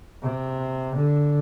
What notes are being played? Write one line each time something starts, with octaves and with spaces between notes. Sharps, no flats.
C3
D3